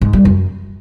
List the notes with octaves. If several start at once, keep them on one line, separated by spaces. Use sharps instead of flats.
G#2
G3
F#2